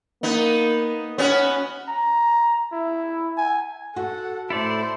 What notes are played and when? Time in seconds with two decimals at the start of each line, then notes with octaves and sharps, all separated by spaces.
0.23 A#3 B3 D#4
1.18 B3 C#4 F#4 C#5
1.88 A#5
2.73 E4
3.37 G#5
3.96 F#4 A4 F#5
4.50 A2 E4 A4 C5 D5